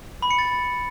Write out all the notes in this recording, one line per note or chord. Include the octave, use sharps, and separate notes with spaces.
B5
C#7
A6